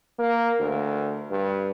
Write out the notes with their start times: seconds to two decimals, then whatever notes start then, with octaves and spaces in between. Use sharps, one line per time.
0.18 A#3
0.60 D2
1.31 G2